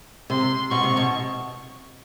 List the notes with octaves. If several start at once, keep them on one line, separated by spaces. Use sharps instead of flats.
C3 C6
B2 C#6
C3
B2